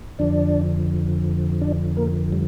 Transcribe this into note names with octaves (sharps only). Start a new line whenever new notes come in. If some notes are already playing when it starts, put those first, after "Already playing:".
F2 D3 F3 D4 D5
D4 D5
A#3 A#4
G3